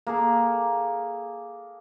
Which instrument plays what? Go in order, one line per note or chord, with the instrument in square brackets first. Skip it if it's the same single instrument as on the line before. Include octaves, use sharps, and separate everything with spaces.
[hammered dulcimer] A#3 G#4 A4